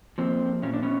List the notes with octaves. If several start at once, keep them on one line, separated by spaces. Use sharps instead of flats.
F3 A#3 C4
A#2 C#4
D4
B3 C#4